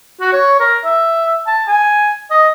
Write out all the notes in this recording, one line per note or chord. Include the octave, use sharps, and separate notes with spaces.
F#4
C#5
A#4
E5
A5
G#5
D#5